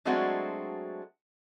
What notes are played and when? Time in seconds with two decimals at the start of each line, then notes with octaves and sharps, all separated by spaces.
0.05 F#3 G#3 A3 C4 D4 F#4